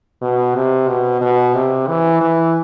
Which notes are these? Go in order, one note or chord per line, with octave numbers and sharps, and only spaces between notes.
B2
C3
B2
B2
C3
E3
E3